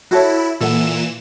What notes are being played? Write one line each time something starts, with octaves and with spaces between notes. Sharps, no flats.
E4 F#4 A4 C#5
A#2 E3 A4 F#5 E7